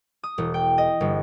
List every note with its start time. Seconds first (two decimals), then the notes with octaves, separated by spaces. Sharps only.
0.23 D#6
0.38 E1
0.54 G5
0.78 D#5
1.00 G1